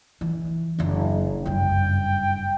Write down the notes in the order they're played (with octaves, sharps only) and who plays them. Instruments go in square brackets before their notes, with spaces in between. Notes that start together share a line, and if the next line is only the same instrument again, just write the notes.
[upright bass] E3
F#1 D4
[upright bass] F#1 G2 [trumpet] G5